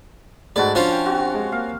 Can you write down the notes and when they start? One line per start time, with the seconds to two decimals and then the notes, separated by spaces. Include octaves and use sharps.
0.56 G#2 G#3 A3 F#4 D5 A5 B5
0.75 F3 C#4 D4 F4 C5
0.92 G5
1.06 C4 F#4 G4
1.34 G#3
1.52 A#3 F5